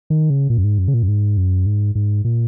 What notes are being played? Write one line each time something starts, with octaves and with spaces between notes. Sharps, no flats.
D#3
C#3
A#2
F#2
G#2
F#2
C#3
A#2
F#2
G#2
F#2
G#2
G#2
A#2